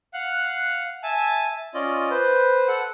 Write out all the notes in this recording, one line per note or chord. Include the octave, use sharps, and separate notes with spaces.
F5 F#5 F#6
E5 G#5 A5
C#4 F4 D5 D#5
B4 C5
A4 F#5